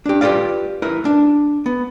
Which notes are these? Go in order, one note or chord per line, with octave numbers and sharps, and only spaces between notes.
D4 G4
F4 G4 A#4 B4 D5 F5
E4 A#4 B4
D4
B3